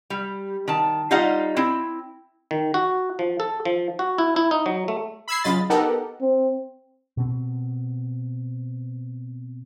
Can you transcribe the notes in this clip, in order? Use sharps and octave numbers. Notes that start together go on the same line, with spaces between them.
G3
D#3 A5
G3 D#4 F4 D#5 F5 F#5
C4 E4
D#3
F#4
F3
A4
F3
F#4
E4
E4
D#4
F#3
A3
B5 E6 G#6 C7
C#3 F#3 F4 D#5 B5 A6
B3 D#4 G4 A4 A#4 F#5
C4
B2 C4